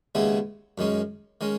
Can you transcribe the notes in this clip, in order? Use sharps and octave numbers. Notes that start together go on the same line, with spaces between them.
D#2 C#3 G#3 B3 E4
F#2 D#3 G#3 C#4
D#3 G#3 C#4